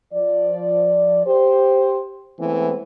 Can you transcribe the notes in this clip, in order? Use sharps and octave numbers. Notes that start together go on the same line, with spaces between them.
F3 D5
G4 C5
E3 G#3 A3 B3 C4